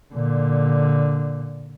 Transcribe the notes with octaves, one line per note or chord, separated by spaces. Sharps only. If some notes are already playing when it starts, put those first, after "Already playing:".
A#2 D3